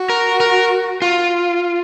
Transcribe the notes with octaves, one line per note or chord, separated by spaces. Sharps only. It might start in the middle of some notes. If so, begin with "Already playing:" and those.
Already playing: F#4
A#4
A#4
F4